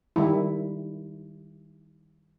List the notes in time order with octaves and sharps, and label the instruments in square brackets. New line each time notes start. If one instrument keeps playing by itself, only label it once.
[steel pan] D#3 G3 E4